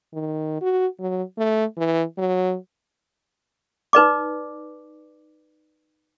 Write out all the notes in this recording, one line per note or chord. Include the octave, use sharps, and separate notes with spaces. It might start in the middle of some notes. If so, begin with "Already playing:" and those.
D#3
F#4
F#3
A3
E3
F#3
D#4 B4 D5 D6